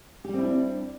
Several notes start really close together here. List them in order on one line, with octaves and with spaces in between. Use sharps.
G4 G3 C4 E4 D4